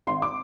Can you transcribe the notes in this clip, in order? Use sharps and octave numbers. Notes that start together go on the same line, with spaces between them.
G#1 C6
D6